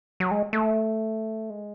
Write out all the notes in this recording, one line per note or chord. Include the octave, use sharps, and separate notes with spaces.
F#3
G#3
A3
G#3